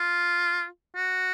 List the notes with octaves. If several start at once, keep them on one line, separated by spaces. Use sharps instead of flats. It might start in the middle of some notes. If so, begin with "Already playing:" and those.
Already playing: F4
F#4